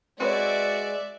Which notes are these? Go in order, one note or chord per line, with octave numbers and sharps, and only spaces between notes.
G#3 C4 F#4 B4 C#5 D5 E5